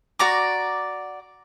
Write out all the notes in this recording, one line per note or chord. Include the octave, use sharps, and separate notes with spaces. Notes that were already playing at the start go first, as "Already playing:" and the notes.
F#4 D5 A#5 D6